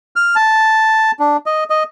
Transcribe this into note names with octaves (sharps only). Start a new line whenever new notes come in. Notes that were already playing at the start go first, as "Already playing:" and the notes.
F6
A5
D4
D#5
D#5